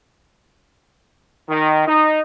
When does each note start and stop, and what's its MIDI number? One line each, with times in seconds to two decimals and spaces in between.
1.49 1.85 51
1.87 2.20 63